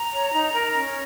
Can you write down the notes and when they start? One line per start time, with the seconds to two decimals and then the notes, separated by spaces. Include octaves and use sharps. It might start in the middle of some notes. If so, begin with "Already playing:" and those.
Already playing: A#5
0.12 C#5
0.33 D#4
0.54 A#4
0.74 C#4